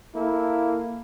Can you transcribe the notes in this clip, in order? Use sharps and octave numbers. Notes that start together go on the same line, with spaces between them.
A#3 E4 A4